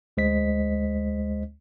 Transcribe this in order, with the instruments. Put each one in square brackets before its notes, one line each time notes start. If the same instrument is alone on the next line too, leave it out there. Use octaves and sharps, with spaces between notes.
[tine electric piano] D2 G#3 C5 D#5 B6